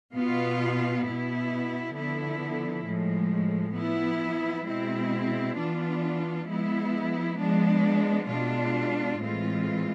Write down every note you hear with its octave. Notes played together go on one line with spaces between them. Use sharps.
B2 B3 F4
B2 B3 E4
D3 F3 B3 E4
A2 F3 G#3
F3 B3 E4
B2 G#3 C4 E4
E3 B3 D4 F4
F3 G#3 B3 E4
F3 G#3 B3 D4
B2 G#3 D4 F4
A2 E3 G#3 C4 F4